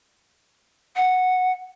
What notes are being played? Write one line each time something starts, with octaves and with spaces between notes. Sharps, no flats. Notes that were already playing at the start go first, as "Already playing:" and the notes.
F#5